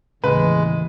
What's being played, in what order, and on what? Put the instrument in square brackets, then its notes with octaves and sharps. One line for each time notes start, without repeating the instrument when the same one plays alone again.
[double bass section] D#2 E3 [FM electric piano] A2 C#3 [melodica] G#3 [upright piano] B4